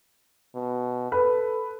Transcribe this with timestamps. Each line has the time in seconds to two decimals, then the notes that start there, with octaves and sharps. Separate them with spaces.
0.55 B2
1.12 A4 B4